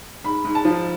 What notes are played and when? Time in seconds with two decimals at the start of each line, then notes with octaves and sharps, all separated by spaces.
0.24 G#2 B5
0.45 G#2
0.55 A5
0.65 F3